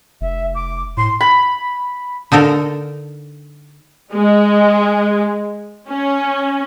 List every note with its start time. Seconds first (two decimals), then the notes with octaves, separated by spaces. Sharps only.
0.21 F1 E5
0.54 D6
0.97 A2 C6
1.21 B5
2.32 D3 D#4 A4 A#4
4.13 G#3
5.90 C#4